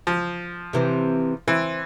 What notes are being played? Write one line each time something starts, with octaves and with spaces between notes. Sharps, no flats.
F3
C3 E3 C4
E3 C4